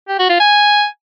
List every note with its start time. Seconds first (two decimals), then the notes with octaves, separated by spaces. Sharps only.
0.09 G4
0.19 F#4
0.30 F4
0.40 G#5